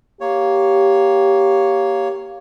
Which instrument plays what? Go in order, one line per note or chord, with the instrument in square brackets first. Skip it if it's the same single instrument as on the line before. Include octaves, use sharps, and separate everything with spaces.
[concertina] A#3 C#5 [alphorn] G4